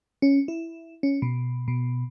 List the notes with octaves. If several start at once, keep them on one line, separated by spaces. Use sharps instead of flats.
C#4
E4
C#4
B2
B2